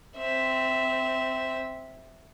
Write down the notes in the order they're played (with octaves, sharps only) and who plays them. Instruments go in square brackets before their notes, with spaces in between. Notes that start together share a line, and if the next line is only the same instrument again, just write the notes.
[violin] C4 E5